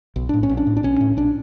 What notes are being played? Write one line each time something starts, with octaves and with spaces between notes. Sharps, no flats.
B1
A2 D4
C#4
B1
D4
A2
D4
B1 C#4
A2
B1 D4